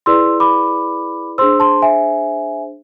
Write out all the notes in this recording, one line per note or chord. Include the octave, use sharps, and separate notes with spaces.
E4 G#4 B4 D5 C6 E6
B5 D6
D4 G#4 C5 C6 E6
A5 C6
E5 G#5